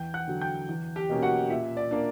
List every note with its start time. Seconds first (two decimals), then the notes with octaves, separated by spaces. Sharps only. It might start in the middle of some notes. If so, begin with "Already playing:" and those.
Already playing: E2 G5 G6
0.14 F#5 F#6
0.28 D3 F#3
0.41 G5 G6
0.69 E2
0.96 G4 G5
1.09 B2 A#3 C#4
1.23 F#4 F#5
1.50 A#2 E5
1.77 D5
1.91 A#3 D4